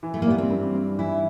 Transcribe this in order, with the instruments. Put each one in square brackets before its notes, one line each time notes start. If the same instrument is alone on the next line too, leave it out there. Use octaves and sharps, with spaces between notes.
[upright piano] E3
[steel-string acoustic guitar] A3
A#3
[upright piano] G3 [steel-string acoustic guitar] B3
[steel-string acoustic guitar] C4
[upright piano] G2
G2
[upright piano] E3 [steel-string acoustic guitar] E4